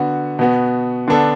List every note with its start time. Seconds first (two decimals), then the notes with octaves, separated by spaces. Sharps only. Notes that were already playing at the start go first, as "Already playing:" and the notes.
Already playing: D3 B3 F#4
0.39 B2 B3 F#4
1.08 D3 B3 D4 A4